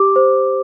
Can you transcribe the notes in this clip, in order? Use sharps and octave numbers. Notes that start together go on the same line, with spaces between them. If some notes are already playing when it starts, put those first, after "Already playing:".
Already playing: G4 D6
C5